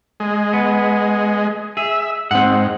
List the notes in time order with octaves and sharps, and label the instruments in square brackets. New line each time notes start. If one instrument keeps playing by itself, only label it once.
[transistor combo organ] G#3
[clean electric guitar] B3
[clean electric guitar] G#4 [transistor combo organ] E5
[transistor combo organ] G#2 [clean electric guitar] C4 F#5